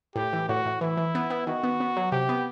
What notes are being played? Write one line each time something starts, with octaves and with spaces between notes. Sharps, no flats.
A2 G4
E3
A2 F#4
A2
E3 E4
E3
B3
B3
D#3 F#4
B3
B3
F#3
C3 G4
B3